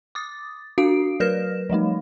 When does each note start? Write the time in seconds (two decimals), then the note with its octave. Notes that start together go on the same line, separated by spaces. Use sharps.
0.15 D6 D#6 A6
0.78 D4 F#4 F5 D#6 C7 D7
1.20 F#3 A#4 B4 F6 A#6 E7
1.70 F3 G3 A3 D#4